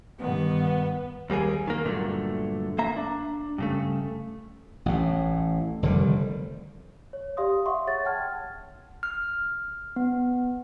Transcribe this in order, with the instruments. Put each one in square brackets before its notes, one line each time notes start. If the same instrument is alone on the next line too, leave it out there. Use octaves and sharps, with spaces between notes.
[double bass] G2 D#3 [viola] B3
[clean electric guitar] D#2 G3 A#3 G#4
D#3 A#3
G2 A#2 D3 F#3 A3
A#3 E5 A#5
D4
G2 C#3 A3
[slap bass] A1 A2
F1 D3 D#3 G3
[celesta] C#5
G4 D5 F5 C6 D#6
E5 F#5 C6 C#6
G#4 C#5 F#5 A6
F#5 G5 A5 F6 G#6
[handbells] F6
B3